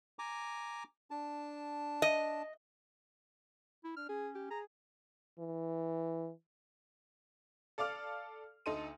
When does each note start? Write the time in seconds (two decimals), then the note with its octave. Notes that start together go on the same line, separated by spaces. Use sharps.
0.19 G#5 A#5 D6
1.11 D4 A5
2.02 D#5
3.84 E4
3.97 D4 F6
4.09 C#4 G#4
4.35 G4
4.50 G#4 A#5
5.39 E3
7.78 A4 D5 F5 D6 F6
8.66 D2 D#4 A4 C6 D#7